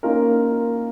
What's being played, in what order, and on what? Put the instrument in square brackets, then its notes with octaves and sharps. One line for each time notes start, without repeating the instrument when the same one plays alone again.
[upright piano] A#3 C#4 D#4 F4 A#4